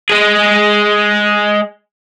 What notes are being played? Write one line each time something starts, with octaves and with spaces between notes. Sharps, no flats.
G#3 G#4